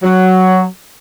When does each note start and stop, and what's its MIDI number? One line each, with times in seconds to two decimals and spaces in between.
0.03 0.64 54